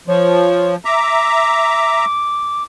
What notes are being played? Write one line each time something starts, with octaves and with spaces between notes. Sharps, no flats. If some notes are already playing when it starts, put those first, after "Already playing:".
F3 C#5
E5 A#5 D6